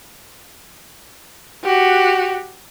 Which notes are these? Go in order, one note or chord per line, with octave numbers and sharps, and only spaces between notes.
F#4 G4